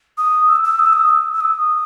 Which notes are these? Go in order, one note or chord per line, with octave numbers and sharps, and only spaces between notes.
D#6
E6
E6
D#6
E6
D#6
E6
E6
D#6